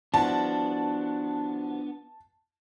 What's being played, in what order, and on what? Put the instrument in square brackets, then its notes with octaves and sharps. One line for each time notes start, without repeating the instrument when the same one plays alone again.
[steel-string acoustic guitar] F3 E4 F#4 [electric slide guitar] B3 D4 [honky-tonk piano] A5